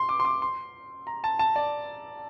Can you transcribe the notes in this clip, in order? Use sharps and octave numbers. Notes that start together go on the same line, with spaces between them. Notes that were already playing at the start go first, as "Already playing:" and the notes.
Already playing: C6
D6
C6
D6
C6
A#5
A5
A5
D5